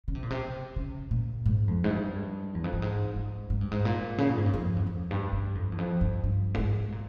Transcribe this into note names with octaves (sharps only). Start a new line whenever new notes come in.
C#3
C3
A#2
C3
C#3
A#2
G#2
F2
G#2
G2
E2
F2
G2
G#2
G#2
G#2
G2
G#2
A#2
C#3
A#2
G#2
G2
F2
E2
F2
G2
G2
F2
E2
F2
G2
G2
A#2
G#2
A#2